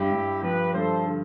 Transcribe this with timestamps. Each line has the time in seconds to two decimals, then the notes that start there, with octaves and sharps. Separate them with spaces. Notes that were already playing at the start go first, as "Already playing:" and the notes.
Already playing: G2 E4 G4
0.12 G2
0.43 F3 G4 B4
0.74 G2 A4 C5
1.06 D3